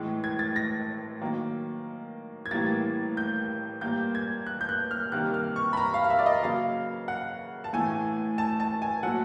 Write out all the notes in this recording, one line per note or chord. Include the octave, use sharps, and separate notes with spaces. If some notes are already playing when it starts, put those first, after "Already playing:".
Already playing: A2 E3 G#3
G#6
A6
A#6
D#3 F#3 A#3
G#6
A2 E3 G3 A#3 A6
G6
A#2 G3 A#3 G6
G#6
F#6
G6
F#6
F6
C3 D#3 G3 A#3 F#6
F6
C#6
B5
A#5
F5
F5
E5
D5
D#5
C#3 F#3 A#3 F5
F#5
A5
A2 E3 A3 G#5
A5
A5
G#5
A#2 F#3 A3 F#5